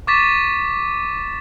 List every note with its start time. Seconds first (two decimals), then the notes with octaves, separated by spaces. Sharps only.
0.07 C#6 D6 A6 B6 E7